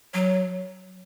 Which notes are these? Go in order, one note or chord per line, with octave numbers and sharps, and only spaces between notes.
F#3